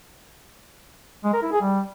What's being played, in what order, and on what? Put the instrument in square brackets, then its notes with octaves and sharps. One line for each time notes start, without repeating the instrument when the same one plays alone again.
[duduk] G#3
A#4
E4
G#4
G3